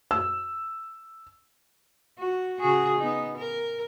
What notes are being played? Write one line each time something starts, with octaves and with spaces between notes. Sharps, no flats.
E6
F#4
C#3 F#4 G#4
B3 D#4
A#4